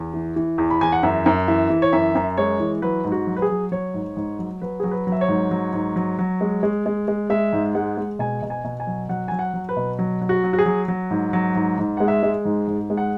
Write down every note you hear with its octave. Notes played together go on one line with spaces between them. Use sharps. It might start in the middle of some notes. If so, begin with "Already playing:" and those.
Already playing: E2
E3
E3
E2
B5
E2 G#5
F#5
F#2 E5
F#2
E3 E5
E3
C#5
F#2 E5
F#2
G#3 C#5
E3
F#3 B4
G#2
F#4
F#3
B4
G#4
F#3
F#3 C#5
G#2
G#2
F#3
F#3 B4
F#3 G#4
B4
F#3
E5
C#5
G#2
F#3
G#2
F#3
F#3
G#3
G#3
G#3
G#3
G#3 E5
G#2
G#3 F#5
G#3
B2 G#5
B2
G#5
B2
G#5
F#3
F#3 F#5
F#3 G#5
F#5
F#3
B4
B2
F#3
F#3
F#4
F#3
F#4
G#4
F#3
F#3
G#2
F#3
G#2
G#2
G#3 F#5
E5
G#3
G#2
G#2
G#3
F#5